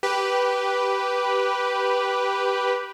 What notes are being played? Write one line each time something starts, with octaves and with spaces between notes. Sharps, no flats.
G4 B4